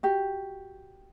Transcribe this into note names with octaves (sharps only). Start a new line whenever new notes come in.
F#4 G4